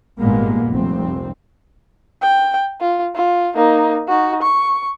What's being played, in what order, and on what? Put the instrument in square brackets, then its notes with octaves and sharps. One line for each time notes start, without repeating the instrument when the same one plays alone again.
[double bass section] G#1 G2 A#2 G#3 A#3 B3
F1 C2 C4
[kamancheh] G5
F4
F4
A#3 D#4
D#4 F#4
C#6